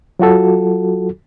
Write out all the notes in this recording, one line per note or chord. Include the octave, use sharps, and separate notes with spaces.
F#3 F4 F#4 A4